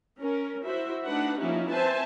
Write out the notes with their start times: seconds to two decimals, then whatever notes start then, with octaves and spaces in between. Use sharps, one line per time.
0.18 C#4 A#4
0.64 E4 F#4 C5 E5
1.06 A3 D4 D#4 B4 F#5
1.38 F3 A#3 C#4 D#4 E4 G4
1.70 C4 B4 C5 E5 G#5 A5